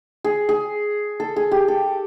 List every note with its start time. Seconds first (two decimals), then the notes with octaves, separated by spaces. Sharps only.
0.24 G#4
0.49 G#4
1.20 A4
1.36 G#4
1.51 G4
1.68 A4